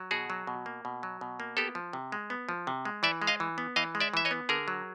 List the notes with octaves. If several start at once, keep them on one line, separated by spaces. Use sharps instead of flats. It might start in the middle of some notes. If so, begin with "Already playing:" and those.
Already playing: F#3
B2 F#4 G#4
F#3
B2
A#3
B2
F#3
B2
A#3
B3 G4 A4
F3
C3
G#3
B3
F3
C3
G#3
E3 D5 E5
G#3
D#5 F5
E3
B3
E3 D#5 F5
G#3
D5 E5
E3 E5
C#5 D#5
B3
D3 G#4 A#4
F#3